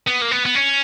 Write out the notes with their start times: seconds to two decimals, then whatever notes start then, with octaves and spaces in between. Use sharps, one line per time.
0.07 B3
0.21 A#3
0.31 B3
0.46 B3
0.55 C#4